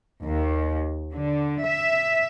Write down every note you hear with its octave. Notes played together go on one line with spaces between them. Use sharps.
D#2
D3
E5